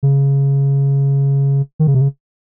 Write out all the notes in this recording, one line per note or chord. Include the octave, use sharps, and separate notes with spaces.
C#3
D#3
C#3
C3
C#3